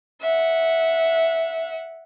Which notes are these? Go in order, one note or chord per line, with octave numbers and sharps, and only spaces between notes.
E5 F#5